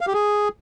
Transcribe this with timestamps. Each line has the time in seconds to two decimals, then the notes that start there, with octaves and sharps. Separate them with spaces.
0.01 F5
0.07 G4
0.14 G#4